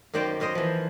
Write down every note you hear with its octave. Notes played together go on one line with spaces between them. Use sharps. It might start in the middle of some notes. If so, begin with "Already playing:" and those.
F#2 D#3 A#3 C5 D5 G5
F#2 A#4 C5 D#5 C6
E3 F3